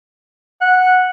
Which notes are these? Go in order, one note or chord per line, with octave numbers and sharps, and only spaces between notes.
F#5